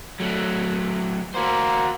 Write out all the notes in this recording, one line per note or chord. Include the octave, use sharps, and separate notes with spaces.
F#3 A3
A#3 F#4 C5